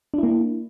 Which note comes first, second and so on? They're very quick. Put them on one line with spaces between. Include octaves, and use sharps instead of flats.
D4 E4 A#3